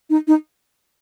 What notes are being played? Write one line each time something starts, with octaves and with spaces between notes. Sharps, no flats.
D#4
D#4